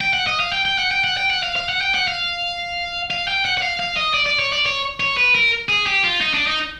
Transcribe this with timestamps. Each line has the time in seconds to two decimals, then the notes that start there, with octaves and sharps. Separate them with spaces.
0.01 G5
0.13 F#5
0.27 D#5
0.40 F5
0.52 G5
0.65 G5
0.78 F#5
0.91 G5
1.04 F#5
1.17 G5
1.30 F#5
1.43 F5
1.56 F5
1.69 F#5
1.81 G5
1.94 F#5
2.08 F5
3.10 F5
3.28 G5
3.45 F#5
3.58 F#5
3.62 F5
3.79 F5
3.97 D#5
4.14 D5
4.26 D5
4.39 C#5
4.52 D5
4.66 C#5
5.00 C#5
5.17 B4
5.35 A#4
5.69 G#4
5.86 G4
6.04 F4
6.21 D#4
6.34 D4
6.47 D#4